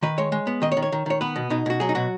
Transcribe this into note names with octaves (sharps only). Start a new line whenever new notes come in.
D#3 B4
G#3 C#5
G#3
B3
D#3 D#5
C#5
D#3
C#5
D#3
D#3 C#5
B3 B4
B2
B2 D#4
B2 F#4
F#3 G#4
D#4
B2 F#4